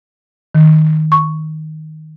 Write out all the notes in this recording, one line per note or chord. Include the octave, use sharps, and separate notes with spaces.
D#3
C#6